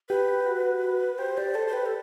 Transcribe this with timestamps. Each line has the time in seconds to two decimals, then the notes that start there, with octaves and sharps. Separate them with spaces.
0.09 G4 B4
0.28 G4
0.46 F#4
1.18 G4 C5
1.37 G4 D5
1.55 A4 C5
1.68 C5
1.73 G4 B4
1.86 A4